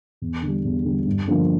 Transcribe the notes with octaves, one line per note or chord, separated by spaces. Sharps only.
E2
D3
G3
E2
D3 G3
G2
D3 F3 A#3 D4